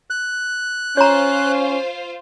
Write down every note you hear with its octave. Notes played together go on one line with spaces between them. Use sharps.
F#6
C#4 F4 C5 C#5 A#5